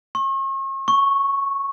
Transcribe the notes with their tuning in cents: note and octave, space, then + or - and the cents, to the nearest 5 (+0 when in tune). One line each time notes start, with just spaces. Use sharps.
C#6 -40
C#6 -5